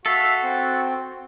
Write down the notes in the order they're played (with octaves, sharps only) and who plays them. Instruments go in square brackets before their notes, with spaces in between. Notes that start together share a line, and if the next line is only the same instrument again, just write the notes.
[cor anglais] F#4 [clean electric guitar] A4 [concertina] E5 F5
[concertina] C4